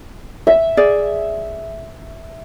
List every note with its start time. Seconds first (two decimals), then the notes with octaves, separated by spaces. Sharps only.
0.47 E5
0.77 G#4 D5